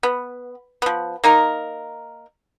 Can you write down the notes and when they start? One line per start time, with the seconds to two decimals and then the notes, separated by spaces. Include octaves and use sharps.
0.03 B3
0.82 F3 B3
1.24 A#3 D#4 A#4